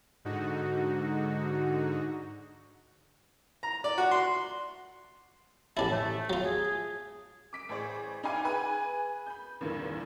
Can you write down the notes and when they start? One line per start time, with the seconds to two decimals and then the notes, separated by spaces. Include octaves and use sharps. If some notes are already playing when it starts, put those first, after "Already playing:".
0.25 G#2 D3 D#4 F#4
3.63 A#5
3.84 D5
3.98 F#4
4.11 C6
5.77 A1 C#4 D4 E4 A5
5.91 A3
6.30 F#3 F4
6.44 G#4
7.53 D6 B6 D7
7.69 A1 G#4 C5 D5 C#6
8.23 D#4 D5 E5 F5 G#5 D6
8.44 G#4 B4 G#5
9.27 B5 G6
9.61 E2 G2 A#2 D3 D#3